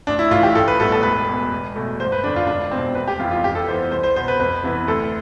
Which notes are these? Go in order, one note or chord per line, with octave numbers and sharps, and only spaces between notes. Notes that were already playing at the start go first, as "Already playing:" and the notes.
A1 D4
E4
A2 F4
E3
G4
A1 A4
B4
A2 G3 B3 A4
A4
E1 B4
E2 B2
E1
E2 B2 A3
G1 C5
B4
F2 D3 D4
F4
E1 D4
E2 B2 C4
F1 B4
G4
F2 E3 F4
F4
F2 G4
A4
E3 B3 C5
C2 C5
C5
B2 B3 C5
B4
F2 B4
C3 E3 B3
D2 A4